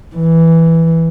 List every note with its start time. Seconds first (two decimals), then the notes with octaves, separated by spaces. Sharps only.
0.16 E3